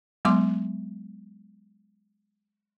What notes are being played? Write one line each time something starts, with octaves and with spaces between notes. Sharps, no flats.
F#3 G#3 B3 C6 D6